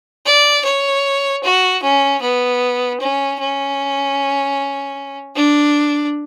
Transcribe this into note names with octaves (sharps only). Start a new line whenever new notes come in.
D5
C#5
F#4
C#4
B3
C#4
C#4
D4